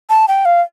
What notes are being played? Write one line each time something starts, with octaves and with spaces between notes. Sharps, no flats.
A5
G5
F5